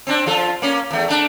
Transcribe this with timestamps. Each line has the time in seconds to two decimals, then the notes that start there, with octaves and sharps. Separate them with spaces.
0.07 C4 D4
0.26 F3 F4 A4
0.62 A#3 C#4
0.91 E2 A3
1.08 A3 D4